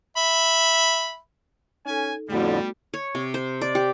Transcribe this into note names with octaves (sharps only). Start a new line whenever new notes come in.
E5 B5
C#4 D#4 A4 G#5
F2 A2 D3 G3 A3 B3 F#4
C#5
C3
C5
D5
G4